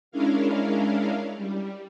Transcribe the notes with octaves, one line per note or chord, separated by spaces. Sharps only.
G#3 C#4 D4 E4 A#4 F5
G3